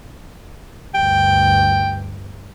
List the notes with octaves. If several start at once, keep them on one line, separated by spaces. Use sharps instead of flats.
D2 G2 G5